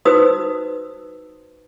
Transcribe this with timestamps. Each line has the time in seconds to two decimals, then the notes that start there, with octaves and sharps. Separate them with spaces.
0.05 D#4 F#4 B4 C5 D#6 E6